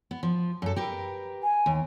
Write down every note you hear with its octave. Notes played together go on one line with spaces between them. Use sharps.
B3
F3
F#2 A4
G4 A#4 B4
G#5
D#2